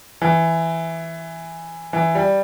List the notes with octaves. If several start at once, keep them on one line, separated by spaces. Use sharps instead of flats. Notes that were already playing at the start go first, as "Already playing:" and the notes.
E3
E3
G3